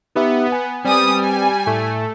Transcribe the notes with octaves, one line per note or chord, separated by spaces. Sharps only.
B3 D#4 G4 E5
G#5
G3 C4 B4 G#5 D#6
G#5
A2 A3